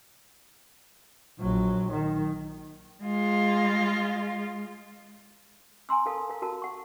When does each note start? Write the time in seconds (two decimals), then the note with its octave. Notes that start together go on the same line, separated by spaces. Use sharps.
1.39 A#1 F#3
1.91 D#3
3.02 G#3 F4
5.89 G#5 A#5 C6 E6
6.06 A4 A#4 F5 A5
6.29 A#4 F5
6.42 F#4 A#4 A5
6.62 F#5 C#6